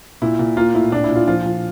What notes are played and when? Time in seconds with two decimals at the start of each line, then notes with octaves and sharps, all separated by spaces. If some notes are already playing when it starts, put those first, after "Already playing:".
0.22 A#2 E4
0.39 A#2
0.57 A#3 F4
0.74 A2 E4
0.92 A#2 D4
1.04 E4
1.10 A#2
1.16 F4
1.28 F3 F4
1.46 F3